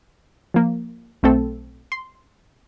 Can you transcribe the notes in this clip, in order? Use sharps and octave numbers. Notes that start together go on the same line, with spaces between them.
F3 A#3
B1 A3 C4 A4
C6